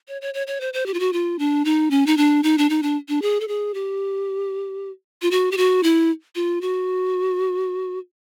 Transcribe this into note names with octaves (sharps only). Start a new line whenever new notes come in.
C#5
C#5
C#5
C#5
C5
C5
G4
F4
F#4
F4
D4
D#4
C#4
D#4
D4
D#4
D4
D#4
D4
D4
G#4
A4
G#4
G4
F4
F#4
G4
F#4
E4
F4
F#4